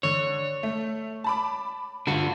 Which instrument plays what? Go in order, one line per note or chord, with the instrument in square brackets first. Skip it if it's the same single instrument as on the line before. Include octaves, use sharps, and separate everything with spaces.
[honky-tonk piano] D3 [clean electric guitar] C#5
[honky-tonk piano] A3
A5 B5 D6
[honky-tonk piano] G2 F4 [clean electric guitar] D3 F#4